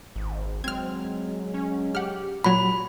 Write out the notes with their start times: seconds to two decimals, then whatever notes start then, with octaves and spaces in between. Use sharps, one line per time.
0.16 G#1
0.64 F#3 G#3 C4 F6 G#6
1.54 C#4
1.95 G4 F#5 F6
2.44 A#2 F#3 B5